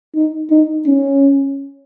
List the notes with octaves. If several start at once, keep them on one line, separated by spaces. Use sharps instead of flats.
D#4
D#4
C#4